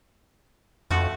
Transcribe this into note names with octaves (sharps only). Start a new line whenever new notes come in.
F2 A3 F#4